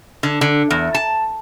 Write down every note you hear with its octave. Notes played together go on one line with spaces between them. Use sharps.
D3
D3
E2
A5